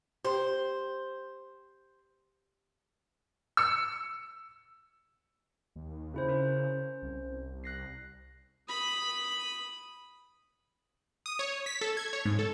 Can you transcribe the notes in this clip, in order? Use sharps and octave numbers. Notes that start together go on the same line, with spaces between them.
G4 C5
E6 C#7
D#2
C#3 C#4 E4 C5
C#4 A#4 C5
C2
F#6 A#6 C7
B5 D#6
D#6
C#5
B6
A4
G#6
C#5
G#2
A4